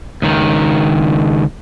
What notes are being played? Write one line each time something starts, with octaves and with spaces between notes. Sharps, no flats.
C#2 D#3